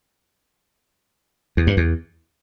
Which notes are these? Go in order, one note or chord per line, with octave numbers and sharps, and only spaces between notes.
E2
G2
E2